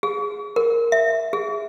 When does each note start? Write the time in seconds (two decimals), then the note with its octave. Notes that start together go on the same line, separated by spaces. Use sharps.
0.03 G#4
0.56 A#4
0.92 E5
1.33 G#4